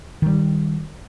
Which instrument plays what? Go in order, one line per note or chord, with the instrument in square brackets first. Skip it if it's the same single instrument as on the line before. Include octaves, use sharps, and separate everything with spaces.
[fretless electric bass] D#3 G3